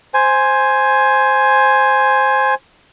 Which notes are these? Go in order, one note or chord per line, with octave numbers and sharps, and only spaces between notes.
C5 G#5